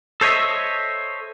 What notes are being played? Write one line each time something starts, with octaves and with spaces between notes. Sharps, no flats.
A4 C5 C#5 D#5 E5